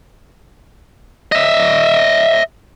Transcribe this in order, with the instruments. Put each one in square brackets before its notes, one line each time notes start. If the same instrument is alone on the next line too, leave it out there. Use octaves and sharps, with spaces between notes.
[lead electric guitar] D#5 E5